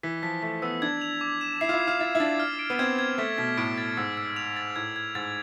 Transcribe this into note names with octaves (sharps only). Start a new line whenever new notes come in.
E3 B6
F3 B6
A3 B6
B3 E6
D4 G#6
F7
D6
E7
E4 C7
F4
E4
G#6
F4
E4 A6
E4
D4 A6
F6
D7
B3
C4 G#6
G#6
A3 B6
B2 B6
A2 D7
A6
G#2 E6
E6
F7
A6
A2 G#6
G#6
G#2 A6